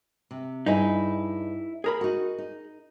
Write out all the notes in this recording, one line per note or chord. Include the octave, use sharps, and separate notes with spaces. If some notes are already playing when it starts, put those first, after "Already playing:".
C3
G2 D#4 E4 G#4 D#5
G#4 A#4 B5
D#4 F#4
D#4